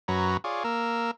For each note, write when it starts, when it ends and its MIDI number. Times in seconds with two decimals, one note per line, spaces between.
0.08 0.37 42
0.08 0.37 54
0.08 0.37 71
0.08 0.37 73
0.08 0.37 82
0.44 0.63 65
0.44 0.63 68
0.44 0.63 73
0.44 0.63 74
0.64 1.11 58
0.64 1.11 70
0.64 1.11 88